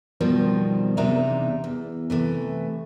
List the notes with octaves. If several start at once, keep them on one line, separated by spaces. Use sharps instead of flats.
B2 D#3 F3 G3 C4
E2 C3 D4 D#4 E5 A#5
E2
C3 E3 A3